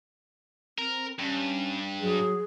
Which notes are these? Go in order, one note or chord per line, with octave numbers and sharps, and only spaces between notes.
C4 A#4
G2 C#4
F#3 G#4